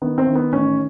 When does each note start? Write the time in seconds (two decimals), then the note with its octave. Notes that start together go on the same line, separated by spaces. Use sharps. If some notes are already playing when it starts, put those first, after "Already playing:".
0.02 D#3 B3
0.18 C4
0.27 D#3
0.35 B3
0.52 A1 C#4